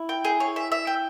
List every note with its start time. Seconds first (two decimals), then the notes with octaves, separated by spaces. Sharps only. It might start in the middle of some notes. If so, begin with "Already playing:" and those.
Already playing: E4
0.09 G5
0.25 G#4
0.40 C#5
0.56 E5
0.72 E5
0.87 G5